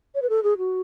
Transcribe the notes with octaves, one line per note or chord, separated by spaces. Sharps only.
C#5
B4
A4
G#4
F#4